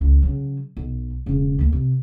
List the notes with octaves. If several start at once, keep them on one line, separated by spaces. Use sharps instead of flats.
C#2
C#3 F#3
B1
E1 C#3
D2 A#3
C3